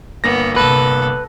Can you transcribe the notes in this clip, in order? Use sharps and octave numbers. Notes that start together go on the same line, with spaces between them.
G1 A#3 B3 A#6
D#1 C3 A4 B4